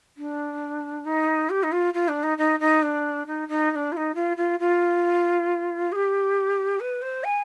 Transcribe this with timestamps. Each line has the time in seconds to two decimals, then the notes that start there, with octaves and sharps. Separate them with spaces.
0.17 D4
1.05 D#4
1.49 G4
1.63 D#4
1.71 F4
1.93 F4
2.08 D4
2.23 D#4
2.37 D#4
2.59 D#4
2.82 D4
3.26 D#4
3.48 D#4
3.70 D#4
3.75 D4
3.92 F4
3.96 D#4
4.14 F4
4.36 F4
4.59 F4
5.91 G#4
5.95 G4
6.79 B4
7.01 C5
7.23 G#5